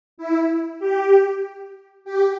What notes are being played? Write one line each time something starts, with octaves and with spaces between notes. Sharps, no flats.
E4
G4
G4